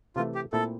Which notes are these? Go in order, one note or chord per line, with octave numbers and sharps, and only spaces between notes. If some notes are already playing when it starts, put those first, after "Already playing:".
C3 E3 A3 F4
G4
A#2 A3 C4 E4 A4